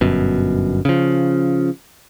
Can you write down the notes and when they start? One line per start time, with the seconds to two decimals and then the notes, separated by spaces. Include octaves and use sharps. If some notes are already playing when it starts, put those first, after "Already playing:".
0.01 G1 F#2 B2
0.85 C#3 F3